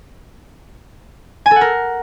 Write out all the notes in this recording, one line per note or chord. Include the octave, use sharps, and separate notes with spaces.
G#5
A4
F#5
A#4